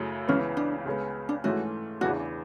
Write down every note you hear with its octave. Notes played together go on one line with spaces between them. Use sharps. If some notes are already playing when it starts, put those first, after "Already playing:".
Already playing: F#2 C#3 F#3 A3 E4
C#2 C#3 E3 B3 C#4
D4
C#2 C#3 G#3 B3
D4
G#2 E3 A3 C#4 F#4
E2 C#3 E3 B3 D4 F#4